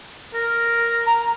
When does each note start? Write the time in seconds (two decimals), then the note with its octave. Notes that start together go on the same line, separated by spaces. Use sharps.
0.34 A#4
1.06 A#5